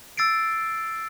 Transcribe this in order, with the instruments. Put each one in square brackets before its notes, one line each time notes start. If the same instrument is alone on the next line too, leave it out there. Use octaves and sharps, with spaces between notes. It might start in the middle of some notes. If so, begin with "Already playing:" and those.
[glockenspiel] E6 A6 C7 D7